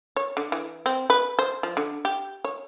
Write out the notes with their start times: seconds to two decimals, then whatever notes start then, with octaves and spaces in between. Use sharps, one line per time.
0.16 C#5
0.37 D3
0.52 E3
0.86 C4
1.10 B4
1.39 C5
1.63 F3
1.77 D3
2.05 G4
2.44 C#5